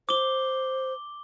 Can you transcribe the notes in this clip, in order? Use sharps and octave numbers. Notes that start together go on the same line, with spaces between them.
C5 D6 G7